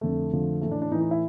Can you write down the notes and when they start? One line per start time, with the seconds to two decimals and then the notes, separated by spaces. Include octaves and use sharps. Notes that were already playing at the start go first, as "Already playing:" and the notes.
0.01 F2 D3 F3 A3
0.32 F2 D3 F3
0.61 A2 E3 A3
0.71 D4
0.82 D4
0.91 A2 D#4
0.94 E3
1.01 D#4
1.11 E4